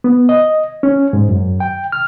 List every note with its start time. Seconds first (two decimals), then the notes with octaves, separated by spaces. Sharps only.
0.04 B3
0.29 D#5
0.83 C#4
1.13 G#2
1.29 F#2
1.60 G5
1.92 F6